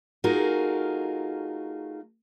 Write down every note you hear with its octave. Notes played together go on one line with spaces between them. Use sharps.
A3 D#4 F4 F#4 G#4 A#4